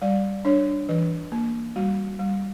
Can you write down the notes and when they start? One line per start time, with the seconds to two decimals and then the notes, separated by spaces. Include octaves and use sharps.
0.02 G3 D5
0.45 D4 C#5
0.89 E3 B4
1.32 A#3
1.76 G3 F#4
2.19 G3